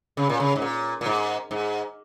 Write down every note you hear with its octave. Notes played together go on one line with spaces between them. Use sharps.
C#3
A#2
C#3
G#2
A#2
A#2
G#2
G#2